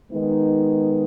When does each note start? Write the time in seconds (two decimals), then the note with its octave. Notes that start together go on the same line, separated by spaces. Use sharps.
0.11 D#3 G#3 B3 D#4